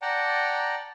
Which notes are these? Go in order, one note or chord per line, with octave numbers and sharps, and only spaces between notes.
D5 F#5 G5 A5 A#5